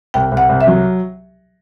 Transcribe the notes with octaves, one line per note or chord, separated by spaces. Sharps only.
C2 G5
C2
F#5
C2
E5
F#3